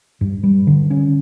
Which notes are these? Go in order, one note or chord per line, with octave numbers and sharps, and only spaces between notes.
G2
G3
D3
C#4